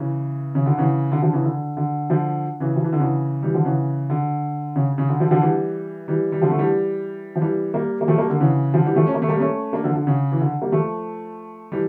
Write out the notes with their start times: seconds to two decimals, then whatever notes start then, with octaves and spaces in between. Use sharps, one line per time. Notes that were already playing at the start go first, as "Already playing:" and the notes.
Already playing: C#3 E3
0.55 C#3
0.66 D3
0.77 C#3 E3
1.12 D3
1.22 D3 F3
1.33 C#3 E3
1.44 D3
1.77 D3
2.10 D3 F3
2.60 C#3 E3
2.76 F3
2.84 E3
2.92 D3
3.00 C#3 E3
3.43 E3 G3
3.54 D3 F3
3.65 C#3 E3
4.10 D3
4.76 C#3
4.98 C#3
5.09 D3
5.20 D3 F3
5.31 D3 F3
5.42 E3 G3
6.08 E3 G3
6.32 G3
6.42 D3 F3
6.50 A3
6.58 E3 G3
7.36 F3
7.41 E3 G3
7.74 G3 A#3
8.01 A#3
8.08 F3 A3
8.18 G3 A#3
8.30 D3
8.40 C#3 E3
8.73 D3 F3
8.85 E3 G3
8.96 F3 A3
9.07 C#4
9.14 A#3
9.22 A3
9.29 G3 A#3
9.40 A3 C#4
9.73 A#3 D4
9.84 D3 F3
9.95 D3
10.07 C#3
10.32 E3
10.40 D3
10.61 G3 A#3
10.72 F3 A3
11.72 E3 G3